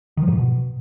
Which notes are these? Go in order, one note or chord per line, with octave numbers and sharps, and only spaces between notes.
D#3
F3
G#2
A#2
B2